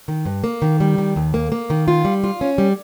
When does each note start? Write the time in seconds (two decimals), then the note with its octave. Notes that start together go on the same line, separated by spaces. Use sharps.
0.08 D#3
0.25 G2
0.44 A#3
0.62 D#3
0.80 G3
0.98 D#3
1.16 D#2
1.34 A#3
1.52 A#3
1.70 D#3
1.88 F4
2.05 G3
2.24 F4
2.41 C#4
2.58 G3